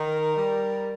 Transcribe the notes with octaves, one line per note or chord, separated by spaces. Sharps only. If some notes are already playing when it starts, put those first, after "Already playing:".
Already playing: D#3 A#4
G3